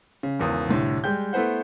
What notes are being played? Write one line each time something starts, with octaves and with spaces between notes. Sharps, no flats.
C#3
G#1 E2 C#3 D#6
C2 A2 D3
G3 G#3 G5 G6
A3 B3 E4 B4 C5 F#5